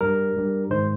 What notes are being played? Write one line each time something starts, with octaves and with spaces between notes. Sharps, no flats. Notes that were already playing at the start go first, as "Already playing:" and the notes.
G2 G3 A#4
G2 G3
G#2 D#3 G#3 C5